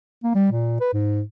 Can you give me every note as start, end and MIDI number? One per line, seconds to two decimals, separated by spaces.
0.23 0.33 58
0.35 0.50 55
0.51 0.79 46
0.81 0.89 71
0.93 1.22 44